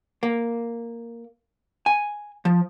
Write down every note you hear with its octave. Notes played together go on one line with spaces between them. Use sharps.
A#3
G#5
F3